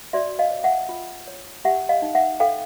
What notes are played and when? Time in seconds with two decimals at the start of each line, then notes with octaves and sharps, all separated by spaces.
0.13 F#4 D5 E5
0.39 D#5 F5
0.51 C#5
0.64 E5 F#5
0.89 F4
1.28 C#5
1.65 G4 E5 F#5
1.89 D#5 F5
2.02 D#4
2.15 E5 F#5
2.40 A4 F5 G5